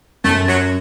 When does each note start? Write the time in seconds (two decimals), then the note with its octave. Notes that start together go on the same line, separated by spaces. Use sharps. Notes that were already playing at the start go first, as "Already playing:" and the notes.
0.24 F#2 A3
0.48 F#3